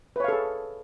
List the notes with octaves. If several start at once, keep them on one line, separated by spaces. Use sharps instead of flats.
G#4 A4 B4 C#5 F5